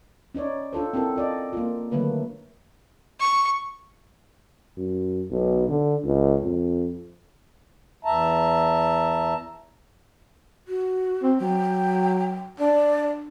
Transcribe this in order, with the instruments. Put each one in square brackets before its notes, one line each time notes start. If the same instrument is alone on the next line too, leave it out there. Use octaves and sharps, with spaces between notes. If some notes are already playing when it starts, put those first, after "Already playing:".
[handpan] C#4 D#4 C#5 D5
D4 F4 A4 C5
C4 E4 F#4 A4 A#4
F4 D5 D#5
A#3 F4
D3 D#3 F#3 A3 A#3 B4
[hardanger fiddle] C#6
[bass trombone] F#2
B1
D3
C#2
F2
[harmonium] E2 E5 A5 A#5
[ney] F#4
[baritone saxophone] C4
[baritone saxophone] F#3 [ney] G5
[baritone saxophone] D4 [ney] D5